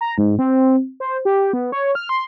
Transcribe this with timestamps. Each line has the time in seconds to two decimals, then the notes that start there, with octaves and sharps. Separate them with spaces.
0.01 A#5
0.18 G#2
0.39 C4
1.00 C5
1.25 G4
1.53 B3
1.72 C#5
1.95 F6
2.09 C6